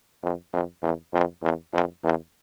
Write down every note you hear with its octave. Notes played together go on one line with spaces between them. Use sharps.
F2
F2
E2
F2
E2
F2
E2